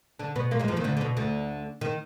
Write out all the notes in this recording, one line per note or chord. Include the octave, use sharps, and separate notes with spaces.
D3 D4
B2 B3
A#2 A#3
G#2 G#3
F2 F3
D#2 D#3
D2 D3
D3
B2
D2 D3
D#3